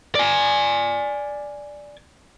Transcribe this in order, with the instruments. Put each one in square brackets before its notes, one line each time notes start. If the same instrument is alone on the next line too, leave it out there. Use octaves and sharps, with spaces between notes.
[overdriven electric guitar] D5 G#5